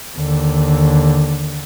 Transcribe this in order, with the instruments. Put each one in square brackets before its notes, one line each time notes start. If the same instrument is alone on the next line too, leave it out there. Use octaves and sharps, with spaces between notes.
[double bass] D#2 D3